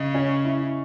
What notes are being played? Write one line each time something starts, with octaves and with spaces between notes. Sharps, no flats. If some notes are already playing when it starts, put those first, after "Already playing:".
Already playing: C#3 D#5
C#4
E4